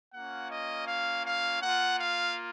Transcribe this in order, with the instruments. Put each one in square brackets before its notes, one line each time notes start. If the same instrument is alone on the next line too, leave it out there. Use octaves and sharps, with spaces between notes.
[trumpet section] A#3 C#4 F4 F#5
D#5
F5
F5
A#3 F4 F#5
F5